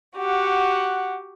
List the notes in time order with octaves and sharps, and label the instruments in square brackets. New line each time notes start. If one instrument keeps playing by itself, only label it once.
[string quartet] F#4 G4 [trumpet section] F#5